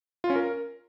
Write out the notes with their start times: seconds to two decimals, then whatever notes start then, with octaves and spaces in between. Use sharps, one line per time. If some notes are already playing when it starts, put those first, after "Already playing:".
0.24 F4
0.30 C#4
0.36 A#4